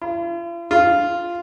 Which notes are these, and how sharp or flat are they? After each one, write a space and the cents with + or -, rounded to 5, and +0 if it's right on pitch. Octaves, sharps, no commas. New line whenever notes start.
F4 -45
F4 -5